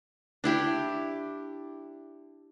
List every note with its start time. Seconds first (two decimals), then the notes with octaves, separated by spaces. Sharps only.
0.44 D4 E4 G4